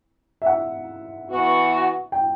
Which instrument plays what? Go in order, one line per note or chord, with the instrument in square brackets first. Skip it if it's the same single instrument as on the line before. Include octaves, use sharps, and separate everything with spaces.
[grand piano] E5
F#5
[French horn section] E3 B3 F#4
[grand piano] G5